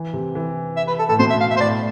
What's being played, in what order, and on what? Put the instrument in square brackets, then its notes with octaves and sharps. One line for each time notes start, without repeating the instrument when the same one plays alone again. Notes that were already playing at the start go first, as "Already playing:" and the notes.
Already playing: [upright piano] E3
C3
E3
[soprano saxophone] E5
B4
A4
[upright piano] A2 [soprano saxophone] A4
[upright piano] B2 [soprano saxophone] C5
[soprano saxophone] E5
F5
E5
C5
[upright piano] A2 [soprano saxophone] D5